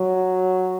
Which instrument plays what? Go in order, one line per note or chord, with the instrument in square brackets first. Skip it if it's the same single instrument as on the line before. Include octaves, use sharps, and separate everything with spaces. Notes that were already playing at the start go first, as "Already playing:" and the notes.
Already playing: [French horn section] F#3